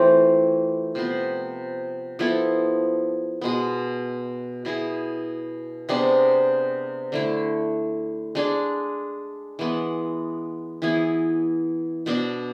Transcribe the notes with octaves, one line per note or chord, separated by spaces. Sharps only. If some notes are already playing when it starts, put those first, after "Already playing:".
Already playing: E3 A3 C4 F4
C3 F3 B3
F3 B3 E4 A4
B2 G#3 B3
B2 B3 E4 G#4
C3 G#3 B3 D4
D3 A3 E4
G#3 D4 G#4
E3 G#3 B3
E3 B3 E4 G#4
B2 B3 D4